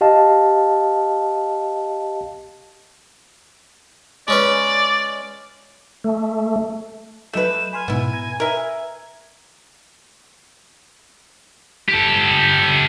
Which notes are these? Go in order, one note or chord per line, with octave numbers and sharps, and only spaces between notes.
G4 D#5 F5 A5
G#3 C#4 B4 D5
A3
F#3 A3 B4 D#5 G6 E7
G#5 B5 C6 F6
G#2 B2 B3 E4
A#5 G#6
A#4 B4 E5
G4 A4